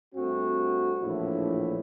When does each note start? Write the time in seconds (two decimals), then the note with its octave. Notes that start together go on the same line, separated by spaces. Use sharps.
0.14 G2 A3 C4 F#4
1.01 A#1 E2 A2 D4 E4